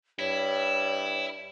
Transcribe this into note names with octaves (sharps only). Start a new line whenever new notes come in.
G2 E4 C#5